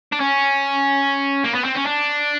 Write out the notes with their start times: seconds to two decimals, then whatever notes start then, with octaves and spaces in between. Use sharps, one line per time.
0.12 D4
0.20 C#4
1.44 A#3
1.55 B3
1.65 C4
1.77 C#4
1.87 D4